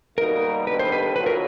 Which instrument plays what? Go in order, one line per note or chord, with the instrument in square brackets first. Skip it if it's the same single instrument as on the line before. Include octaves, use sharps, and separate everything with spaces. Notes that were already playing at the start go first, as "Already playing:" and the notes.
[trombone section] B2 G3 A#3 D#4 [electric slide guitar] A#4
[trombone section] D#2 D3 G3 B3 [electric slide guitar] B4
[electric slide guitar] C5
B4
[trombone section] B1 A#2 F#3 [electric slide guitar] B4
[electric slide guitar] A#4